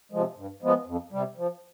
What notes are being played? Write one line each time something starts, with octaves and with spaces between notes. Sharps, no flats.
C3 F3 G#3
G2
F3 G#3 B3
F2
C3 G3
F3